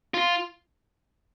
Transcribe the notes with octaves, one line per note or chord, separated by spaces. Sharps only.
F4